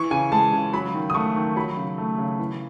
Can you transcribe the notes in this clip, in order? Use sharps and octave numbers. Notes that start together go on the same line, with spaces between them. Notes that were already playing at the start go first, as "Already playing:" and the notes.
Already playing: E3 C#6
C#3 G#5
G#3 A5
C#3
F#3 B5
D#3
D#6
A3 C#6
D#3
F#3 B5
C#3
A3
C#3
E3